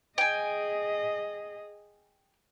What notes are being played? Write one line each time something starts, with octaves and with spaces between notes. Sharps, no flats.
G#4 D#5 G5 G#5